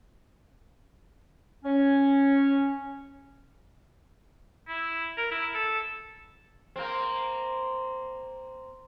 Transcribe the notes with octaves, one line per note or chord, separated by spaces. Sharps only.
C#4
E4
A#4
E4
A4
A#3 C4